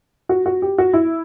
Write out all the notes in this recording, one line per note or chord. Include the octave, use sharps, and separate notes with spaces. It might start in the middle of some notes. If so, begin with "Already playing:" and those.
F#4
F#4
G4
F#4
E4